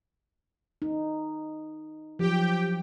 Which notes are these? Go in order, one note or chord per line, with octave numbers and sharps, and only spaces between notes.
D#4
F3 F#3 G4 G5